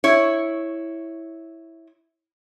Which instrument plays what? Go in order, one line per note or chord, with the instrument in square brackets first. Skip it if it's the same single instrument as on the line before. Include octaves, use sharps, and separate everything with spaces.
[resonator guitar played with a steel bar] E4 C#5